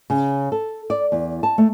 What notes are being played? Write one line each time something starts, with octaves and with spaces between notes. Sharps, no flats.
C#3
A4
D5
E2
A5
A3